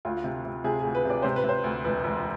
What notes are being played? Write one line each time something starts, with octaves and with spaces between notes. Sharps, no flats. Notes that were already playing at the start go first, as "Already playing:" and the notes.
D2 F4
C3
C3
C3 G#4
D2 G#4
B4
C3 D5
C3 C5
B4
C3 C5
D2
E1 B4
E1